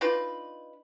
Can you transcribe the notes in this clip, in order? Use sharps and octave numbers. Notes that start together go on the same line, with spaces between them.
D4 D#4 F4 B4